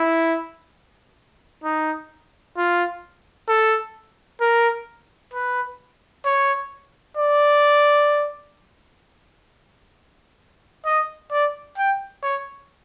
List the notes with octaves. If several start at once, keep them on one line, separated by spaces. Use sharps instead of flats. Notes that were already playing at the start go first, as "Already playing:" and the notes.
Already playing: E4
D#4
F4
A4
A#4
B4
C#5
D5
D#5
D5
G5
C#5